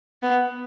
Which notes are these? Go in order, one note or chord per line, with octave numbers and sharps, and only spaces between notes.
B3